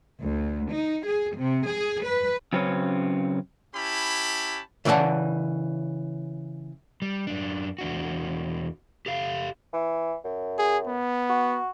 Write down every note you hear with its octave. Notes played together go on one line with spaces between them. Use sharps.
D2
D#4
G#4
C3
G#4
B4
C#3 F#3 C4 C#4 B4 C#5
C#4 E4 G4 A5 B5
C#3 E3 D5 E5 F#5 A5
G3
F#2 D4
E2 D4 F#4
G4 A4 F5
E3
F#2
G#4
B3
F#4